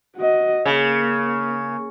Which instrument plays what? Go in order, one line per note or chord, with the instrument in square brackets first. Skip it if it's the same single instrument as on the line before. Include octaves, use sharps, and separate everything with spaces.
[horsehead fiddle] F#4 D#5
[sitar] C#3 [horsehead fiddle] A#3